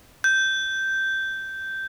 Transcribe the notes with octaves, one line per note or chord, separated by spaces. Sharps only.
G6